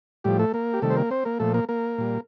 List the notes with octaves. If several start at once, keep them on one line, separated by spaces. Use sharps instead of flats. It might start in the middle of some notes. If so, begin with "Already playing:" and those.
A2 F3 G3 G4
A3 A4
A#3 A#4
G4
C3 D#3 G3 A3 A4
C5
A#3 A#4
C4 C5
A#3 A#4
A#2 F3 A3 A4
A#3 A#4
A#3 A#4
A#2 G3